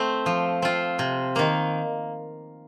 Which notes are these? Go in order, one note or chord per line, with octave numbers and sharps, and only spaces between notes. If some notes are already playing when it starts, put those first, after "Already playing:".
Already playing: A3 C4
F3
C4 F4
C3
D#3 A#3